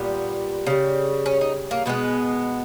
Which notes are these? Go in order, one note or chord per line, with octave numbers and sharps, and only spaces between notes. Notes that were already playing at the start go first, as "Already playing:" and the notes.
Already playing: A#2 G3 B3
C#3 G3
C#4
D#4
A#3
B2 G#3 B3